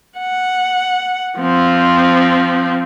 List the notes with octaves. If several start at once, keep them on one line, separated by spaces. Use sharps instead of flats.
F#5
F3 C4